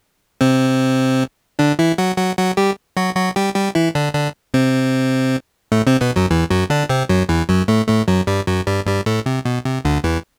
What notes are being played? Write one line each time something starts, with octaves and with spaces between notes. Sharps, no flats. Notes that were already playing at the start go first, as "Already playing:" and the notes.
C3 C4
D3 D4
E3 E4
F#3 F#4
F#3 F#4
F#3 F#4
G3 G4
F#3 F#4
F#3 F#4
G3 G4
G3 G4
E3 E4
D3 D4
D3 D4
C3 C4
A2 A3
C3 C4
B2 B3
F#2 F#3
E2 E3
F#2 F#3
D3 D4
C3 C4
F#2 F#3
E2 E3
F#2 F#3
A2 A3
A2 A3
F#2 F#3
G2 G3
F#2 F#3
G2 G3
G2 G3
A2 A3
C3
B2
C3
D2 D3
E2 E3